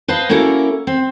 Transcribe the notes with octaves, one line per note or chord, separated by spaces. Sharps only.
B4 C5 D#5 F5 A5
A#3 C#4 E4 F#4 A4 A#4
C4